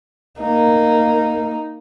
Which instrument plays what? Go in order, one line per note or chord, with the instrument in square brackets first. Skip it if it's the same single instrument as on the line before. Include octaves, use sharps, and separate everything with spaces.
[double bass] A#3 [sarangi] D#4